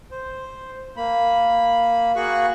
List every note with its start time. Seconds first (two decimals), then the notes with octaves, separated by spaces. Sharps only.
0.11 C5
0.97 A#3 B5
2.16 A#3 F#4 G#4 C#6 F#6